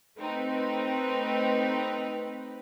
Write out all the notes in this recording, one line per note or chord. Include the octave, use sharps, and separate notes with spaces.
A3 C4 D#4 B4